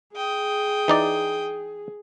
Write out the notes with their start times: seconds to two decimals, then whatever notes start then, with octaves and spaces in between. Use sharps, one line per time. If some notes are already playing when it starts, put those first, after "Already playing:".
0.16 G#4 G5 D#6
0.88 E3 D#4 D5